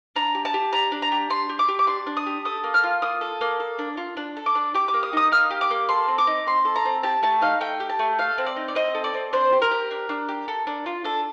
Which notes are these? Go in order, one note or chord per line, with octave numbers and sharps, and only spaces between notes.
D4 A#5
G4
A5
G4
D4 A#5
D4
A#5
G4
D4 C6
G4
D6
G4
D6
D4 C6
D4
D#6
G4
A4 D#6
A#3
F6
F4
A#3 D#6
A4
A#3
A4
D4
F4
D4
A4
D6
D4
G4 D6
D6
A#3
D#6
D#4 D#6
A#3 F6
G4
D6
A#3
A4 C6
C4
D6
D#4
C4 C6
A4
A#5
C4
G4 A5
A3 A5
D#4 F5
A3 G5
G4
A5
A3
A4 F5
C4
D5
D#4
D5
C4 D#5
A4
D5
C4
D4 C5
G4
A#4
G4
D4
D4
G4
A4
D4
F4
D4 A4